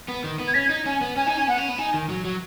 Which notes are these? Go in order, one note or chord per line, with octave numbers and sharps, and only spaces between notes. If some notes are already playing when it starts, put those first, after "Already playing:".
B3
D#3
B3
G#6
C#4 B6
G#6
D#4
C#4 G#5
B3
C#4 G#5
D#4 G#5
C#4 G#5
B3 F#5
C#4
B3
D#4 G#5
D#3
F#3
F#3